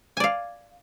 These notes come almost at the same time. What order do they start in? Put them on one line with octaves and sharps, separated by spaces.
G#5 D5 F5